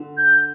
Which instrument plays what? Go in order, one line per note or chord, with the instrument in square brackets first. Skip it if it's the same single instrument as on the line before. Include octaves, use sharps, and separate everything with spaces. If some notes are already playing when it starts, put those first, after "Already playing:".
Already playing: [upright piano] D3
[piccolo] G6